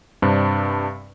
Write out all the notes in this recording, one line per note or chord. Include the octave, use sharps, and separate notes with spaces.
G2 C3 C4 D4